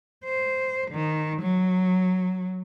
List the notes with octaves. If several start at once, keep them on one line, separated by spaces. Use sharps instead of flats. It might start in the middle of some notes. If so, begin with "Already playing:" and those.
C5
D#3
F#3